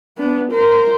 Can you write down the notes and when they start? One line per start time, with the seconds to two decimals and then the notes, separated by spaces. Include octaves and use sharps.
0.17 B3 D4
0.52 A#4 C5